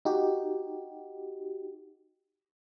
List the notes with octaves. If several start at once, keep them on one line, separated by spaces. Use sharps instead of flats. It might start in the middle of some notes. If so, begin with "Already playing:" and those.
D#4 F#4 G4